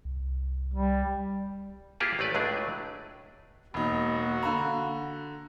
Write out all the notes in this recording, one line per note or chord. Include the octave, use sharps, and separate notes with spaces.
C2
G3
A#3 E4 F4 G4 G#4 B4
A1 A3 B4 D5
C#2 A2 F#3 A3 D4 G#4
E1 A#3 D#4 F#4 B5
D3 F5 A#5 B5